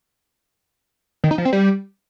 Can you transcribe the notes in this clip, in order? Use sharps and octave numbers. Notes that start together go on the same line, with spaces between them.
D#3
D#4
F3
C4
G3